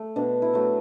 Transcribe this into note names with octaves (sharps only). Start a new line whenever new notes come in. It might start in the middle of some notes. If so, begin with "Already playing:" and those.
Already playing: A3
B2 D4
E4
F#3 A3